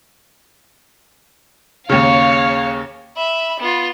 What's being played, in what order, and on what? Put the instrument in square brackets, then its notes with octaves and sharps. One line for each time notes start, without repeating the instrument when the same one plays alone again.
[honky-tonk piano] D#2 C#3 [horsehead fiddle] C#5 [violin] F5
[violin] E5 B5
B3 F4